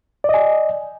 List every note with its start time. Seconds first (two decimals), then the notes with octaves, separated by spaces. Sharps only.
0.24 D5
0.29 D#5
0.34 G#5